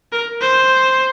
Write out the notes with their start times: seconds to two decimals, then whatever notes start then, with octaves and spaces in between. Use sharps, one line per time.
0.12 A#4
0.41 C5